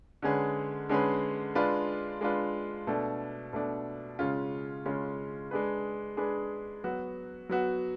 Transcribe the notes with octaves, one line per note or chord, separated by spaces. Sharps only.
D3 G#3 C#4 G#4 B4
D3 G#3 C#4 G#4 B4
G#3 D4 F4 B4
G#3 D4 F4 B4
B2 A3 D4
B2 A3 D4
C#3 G#3 C#4 F4
C#3 G#3 C#4 F4
G#3 D4 G#4 B4
G#3 D4 G#4 B4
F#3 B3 F#4
F#3 B3 F#4